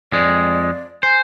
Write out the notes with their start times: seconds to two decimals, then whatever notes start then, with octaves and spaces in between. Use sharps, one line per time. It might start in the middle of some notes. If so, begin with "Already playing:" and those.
0.12 F2 G#3 D5
1.03 C5 G#5